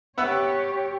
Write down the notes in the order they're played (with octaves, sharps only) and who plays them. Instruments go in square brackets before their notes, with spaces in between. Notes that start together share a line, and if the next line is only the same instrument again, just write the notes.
[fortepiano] B3 E5 F#5 [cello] G4 C#5